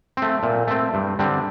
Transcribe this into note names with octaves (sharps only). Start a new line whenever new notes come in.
A3 C4
A#2
A3 C4
G2
D3 G3 C4